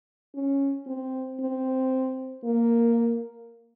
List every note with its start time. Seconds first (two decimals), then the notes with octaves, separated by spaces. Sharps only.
0.35 C#4
0.87 C4
1.40 C4
2.44 A#3